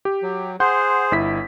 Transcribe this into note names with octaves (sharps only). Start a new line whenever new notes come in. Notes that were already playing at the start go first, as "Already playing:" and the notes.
G4
F#3
G#4 C5 F#5 C6 G6
G1 E4 B6